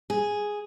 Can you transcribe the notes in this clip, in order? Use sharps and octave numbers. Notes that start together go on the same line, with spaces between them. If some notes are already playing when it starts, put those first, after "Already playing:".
G#4